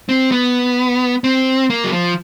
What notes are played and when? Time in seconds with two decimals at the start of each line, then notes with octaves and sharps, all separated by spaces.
0.09 C4
0.32 B3
1.24 C4
1.70 A#3
1.84 F#3
1.92 F3